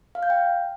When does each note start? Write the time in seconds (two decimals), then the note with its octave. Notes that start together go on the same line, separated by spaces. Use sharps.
0.15 F5
0.23 G6
0.30 G5